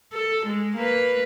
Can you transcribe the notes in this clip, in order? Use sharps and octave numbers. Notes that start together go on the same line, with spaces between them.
A4
G#3
A#3 B4